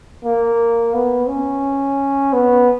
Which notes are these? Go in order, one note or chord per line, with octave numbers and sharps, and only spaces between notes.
A#3
B3
C#4
B3